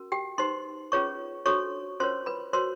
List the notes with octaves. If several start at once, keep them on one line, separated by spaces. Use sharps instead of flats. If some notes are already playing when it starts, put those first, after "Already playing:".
Already playing: C#4 F#4 A#4
G4 G5
D#4 G4 B4 C5 C6
C#4 F4 G#4 B4 C#5 C#6
D4 F#4 A4 C5 C#5 C#6
C#4 F4 A#4 C5 C#5 C6
B4 B5
F#4 A#4 C5 C#5 C6